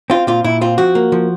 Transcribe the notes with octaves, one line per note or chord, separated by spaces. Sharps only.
C4 F4
A#2 F4
A#2 E4
C4 F4
F3 F#4
A#3
F3